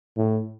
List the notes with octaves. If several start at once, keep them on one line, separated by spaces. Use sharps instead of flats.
A2